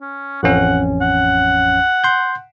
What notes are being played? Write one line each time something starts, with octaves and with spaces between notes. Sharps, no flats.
C#4
A1 F2 C#4 F#5
F#5
C6 G6